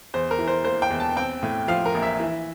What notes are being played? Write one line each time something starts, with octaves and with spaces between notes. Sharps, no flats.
E2 C5
A#4
E3
C5
A#3 C5
G5
E2
A5
C4 G5
A2
F3 F5
A#4
A#1
E5
E3